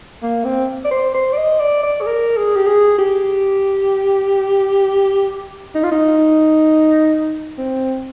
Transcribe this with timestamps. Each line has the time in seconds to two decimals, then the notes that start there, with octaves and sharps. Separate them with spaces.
0.23 A#3
0.44 C4
0.85 D5
0.91 C5
1.14 C5
1.33 D5
1.37 D#5
1.59 D5
1.83 D5
2.01 G#4
2.07 A#4
2.37 G#4
2.56 G4
2.67 G#4
2.98 G4
5.75 D#4
5.83 F4
5.92 D#4
7.58 C4